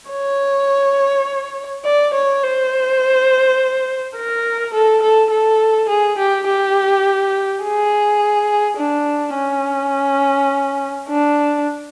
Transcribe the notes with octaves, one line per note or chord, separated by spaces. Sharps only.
C#5
D5
C#5
C5
A#4
A4
A4
A4
G#4
G4
G4
G#4
D4
C#4
D4